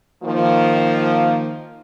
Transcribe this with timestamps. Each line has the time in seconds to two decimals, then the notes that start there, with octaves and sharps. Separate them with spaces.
0.22 D#3 F3 A#3